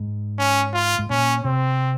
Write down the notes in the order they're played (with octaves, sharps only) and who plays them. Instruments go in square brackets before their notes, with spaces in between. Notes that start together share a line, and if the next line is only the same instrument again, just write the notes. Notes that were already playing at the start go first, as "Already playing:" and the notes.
Already playing: [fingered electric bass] G#2
[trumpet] C#4
F4
[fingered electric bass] G#2
[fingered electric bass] A#2 [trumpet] C#4
[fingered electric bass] C3 [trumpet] C4